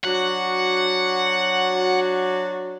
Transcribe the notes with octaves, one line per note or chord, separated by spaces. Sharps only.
F#3 D4 F#4 F#5